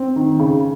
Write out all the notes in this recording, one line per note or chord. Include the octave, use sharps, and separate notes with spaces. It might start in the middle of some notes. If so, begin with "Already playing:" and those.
Already playing: C4
D#3
C#3